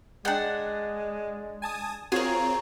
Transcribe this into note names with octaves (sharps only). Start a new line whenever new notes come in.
G#3 D4 F#5 G5 F#6 G6
G#5 A5 D#6
C4 F4 F#4 G#4 A#4 C#5